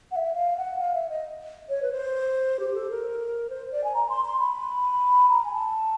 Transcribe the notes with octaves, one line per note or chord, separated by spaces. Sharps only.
F#5
E5
F5
F#5
F5
E5
D#5
C#5
B4
C5
G4
A4
A#4
C5
D5
G#5
A#5
C6
C6
B5
A#5
G#5
A5